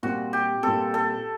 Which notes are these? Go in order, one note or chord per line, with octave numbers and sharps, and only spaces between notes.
A#2 G3 C4 F#4
G4
A#2 G3 C4 A4
A4